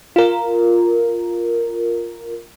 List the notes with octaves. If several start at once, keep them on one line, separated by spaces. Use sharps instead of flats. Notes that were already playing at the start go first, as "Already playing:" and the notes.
F4 A#4